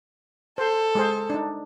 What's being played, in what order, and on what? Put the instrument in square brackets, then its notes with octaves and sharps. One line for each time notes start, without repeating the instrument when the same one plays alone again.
[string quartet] A4 [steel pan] C5
[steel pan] G#3 G#4 C5
D4 D#4